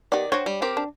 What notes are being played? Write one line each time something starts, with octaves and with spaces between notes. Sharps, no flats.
D#3 B3 G4 D5
D4 F#4 C5 C#5 G5
G3
C4 G4 A#4
D4